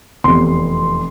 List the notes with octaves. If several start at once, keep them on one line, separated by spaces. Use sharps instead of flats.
F1 E2 C3 C6